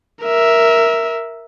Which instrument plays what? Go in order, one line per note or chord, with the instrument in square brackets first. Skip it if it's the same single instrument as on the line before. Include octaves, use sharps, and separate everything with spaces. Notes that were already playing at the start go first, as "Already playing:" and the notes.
[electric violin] A#4 E5